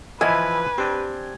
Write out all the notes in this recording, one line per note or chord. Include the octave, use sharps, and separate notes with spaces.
E3 F3 E4 B4 D#5 G#5
C4 D4 G4